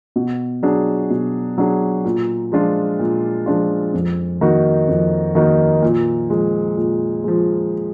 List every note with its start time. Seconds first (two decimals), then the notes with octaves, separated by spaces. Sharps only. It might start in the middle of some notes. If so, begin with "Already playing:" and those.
0.16 B2
0.63 F#3 D4 G#4
1.10 B2
1.58 F#3 D4 G#4
2.05 A#2
2.52 F3 G#3 D4 F4
2.99 A#2
3.46 F3 G#3 D4 F4
3.93 F2
4.41 D#3 A#3 D#4 F#4
4.88 F2
5.35 D#3 A#3 D#4 F#4
5.82 A#2
6.29 F3 G#3
6.77 A#2
7.24 F3 G#3